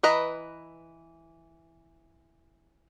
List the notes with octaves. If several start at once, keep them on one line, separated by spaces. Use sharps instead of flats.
E3 B4 D#5 A#5